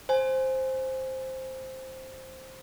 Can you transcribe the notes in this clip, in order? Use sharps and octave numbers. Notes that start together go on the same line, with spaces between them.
C5 G#5